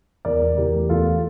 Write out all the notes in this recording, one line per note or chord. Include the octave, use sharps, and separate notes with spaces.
E2 A#4 D5
E2
E3 G4 A#4
A3
E2 F4 A4